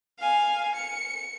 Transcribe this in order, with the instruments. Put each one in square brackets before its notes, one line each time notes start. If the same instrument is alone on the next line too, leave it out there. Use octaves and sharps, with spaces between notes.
[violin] F5 G#5
C#7